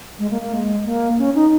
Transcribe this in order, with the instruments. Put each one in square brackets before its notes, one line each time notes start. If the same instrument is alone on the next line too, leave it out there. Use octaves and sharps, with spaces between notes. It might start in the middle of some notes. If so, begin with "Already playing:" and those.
[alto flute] G#3
A#3
A#3
G#3
A#3
C#4
D#4